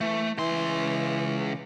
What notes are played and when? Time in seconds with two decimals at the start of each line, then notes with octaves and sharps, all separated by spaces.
0.01 E3 A3
0.38 C#2 E3 C6